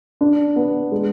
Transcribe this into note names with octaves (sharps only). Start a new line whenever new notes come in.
D4
B3
G#3